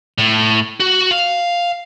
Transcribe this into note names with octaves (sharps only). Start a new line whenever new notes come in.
A2
F#4
F5